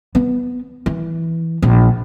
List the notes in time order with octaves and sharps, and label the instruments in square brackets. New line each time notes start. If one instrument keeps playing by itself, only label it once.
[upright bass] B3
E3
A#1